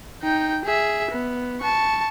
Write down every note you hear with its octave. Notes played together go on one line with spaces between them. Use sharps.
D#4 G5
G#4 E5
B3
A5 C#6